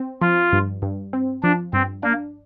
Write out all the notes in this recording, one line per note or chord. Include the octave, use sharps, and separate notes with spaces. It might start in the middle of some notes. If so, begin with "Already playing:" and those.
Already playing: C4
F3 F4
G2
G2
C4
F3 D4
G2 C4
A#3 D4